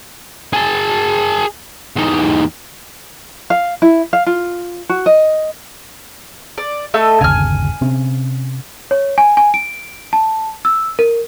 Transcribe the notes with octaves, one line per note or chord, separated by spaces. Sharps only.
G#4 A5
E2 D#4
F5
E4
F5
F4
F#4
D#5
D5
A3 D#5 E6
G1 D#2 C#3 G#5 F6
C3 C4 C#4
C#5
G#5
G#5
D7
A5
E6
A#4